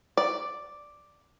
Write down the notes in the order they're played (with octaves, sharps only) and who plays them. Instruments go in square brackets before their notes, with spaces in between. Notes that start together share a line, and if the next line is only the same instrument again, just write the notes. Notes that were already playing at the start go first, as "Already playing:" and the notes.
[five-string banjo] D5